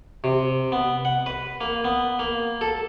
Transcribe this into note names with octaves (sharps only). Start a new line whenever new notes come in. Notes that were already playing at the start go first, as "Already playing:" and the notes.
C3
B3
F#5
B4
A#3
B3
A#3
A4